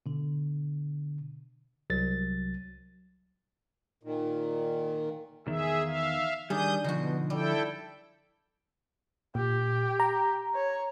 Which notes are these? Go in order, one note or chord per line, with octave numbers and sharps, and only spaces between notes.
B2 D3
C2 F#3 A6
A#2 D#3
E2 D#3 G#4 E5
E5 F5
D#3 G3 D4 G#4 D#6 G6
B2 D3 F3 D#4 F#4
G3 E4 A4 G5
A#2 G4
A#5
C#5